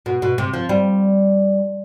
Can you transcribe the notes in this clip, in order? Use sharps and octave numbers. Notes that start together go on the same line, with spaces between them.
B2
B2
C3
F3
G3